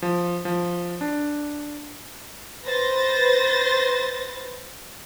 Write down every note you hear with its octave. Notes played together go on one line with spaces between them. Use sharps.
F3
F3
D4
B4 C5 A6 A#6